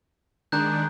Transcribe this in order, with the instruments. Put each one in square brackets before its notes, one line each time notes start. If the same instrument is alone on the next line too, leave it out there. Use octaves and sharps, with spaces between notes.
[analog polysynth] D#3 G#3 D4 [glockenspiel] A#5 F#6 G6